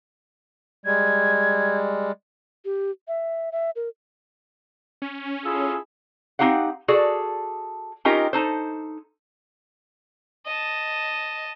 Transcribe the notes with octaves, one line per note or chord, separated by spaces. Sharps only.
G3 G#3 G#6
G4
E5
E5
A#4
C#4
E4 F4 G#4 A4
C4 D#4 G4 F5 F#5
F#4 G#4 A4 D5
C#4 D#4 F4 G4 A#4 D#5
D#4 A4 C5
D#5 A5